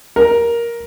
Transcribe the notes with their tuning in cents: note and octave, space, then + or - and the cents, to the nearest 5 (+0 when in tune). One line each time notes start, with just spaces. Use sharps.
A#4 +10